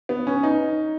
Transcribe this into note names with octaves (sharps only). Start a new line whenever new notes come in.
B3
C#4
D#4